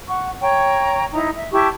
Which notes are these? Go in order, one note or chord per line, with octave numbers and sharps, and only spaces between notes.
F#5 C#6
C#5 G5 A#5 C#6
D#4 E4 A#5
E5
E4 G4 A5 C#6